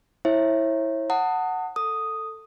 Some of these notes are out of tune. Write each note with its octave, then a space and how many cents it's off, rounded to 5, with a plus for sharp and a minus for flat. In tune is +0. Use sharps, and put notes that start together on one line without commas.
E4 -10 C#5 -35 E5 +0
F#5 +0 A5 +40 D#6 +0
A4 +10 D#6 +0